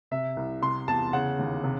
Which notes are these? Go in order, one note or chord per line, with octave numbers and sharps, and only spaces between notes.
C3 E5
C2
C3 C6
E2 A5
C#3 F#5
D#2
C3